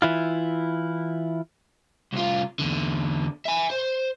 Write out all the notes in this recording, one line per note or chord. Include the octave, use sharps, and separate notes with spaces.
E3 E4 F4
C2 F4
E2 D3
E5 G#5
C5